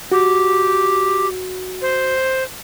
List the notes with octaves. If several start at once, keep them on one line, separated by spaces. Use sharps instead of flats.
F#4 G4
C5